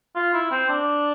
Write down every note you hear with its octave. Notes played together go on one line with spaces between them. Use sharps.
F4
E4
C4
D4